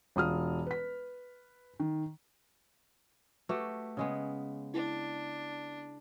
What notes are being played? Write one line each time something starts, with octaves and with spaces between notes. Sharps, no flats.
E1 F4 D#6 F6
B4 B6
D#3
A3 F#4 G4 B4
C#3 G#3 B3
D4 E4